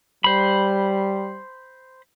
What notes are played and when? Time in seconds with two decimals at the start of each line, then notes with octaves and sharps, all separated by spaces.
0.24 G3 C5 B5